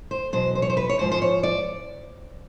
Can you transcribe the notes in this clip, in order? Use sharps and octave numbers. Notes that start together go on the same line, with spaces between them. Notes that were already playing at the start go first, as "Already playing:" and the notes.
C5
E2 B2 F#3 C5
C5
C#5
C5
B4
C#5
G#2 F3 C5
C5
C#5
D5